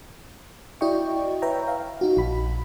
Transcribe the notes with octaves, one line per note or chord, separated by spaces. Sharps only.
E4 F#4 D5 D#5 G5 C#6
B4 C#5 E5 G5 A#5
F5
D#4 F#4
A#1 B5